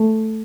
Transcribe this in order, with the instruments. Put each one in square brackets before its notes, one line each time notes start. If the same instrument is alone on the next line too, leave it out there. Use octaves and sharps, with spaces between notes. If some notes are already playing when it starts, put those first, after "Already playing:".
Already playing: [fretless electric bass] A3